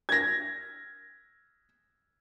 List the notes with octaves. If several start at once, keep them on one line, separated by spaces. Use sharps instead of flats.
G#6 A#6